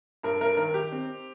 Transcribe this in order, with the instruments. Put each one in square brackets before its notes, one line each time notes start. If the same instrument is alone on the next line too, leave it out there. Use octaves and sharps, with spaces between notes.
[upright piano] G2 A#4
A#4
D#3 A#4
G4
C4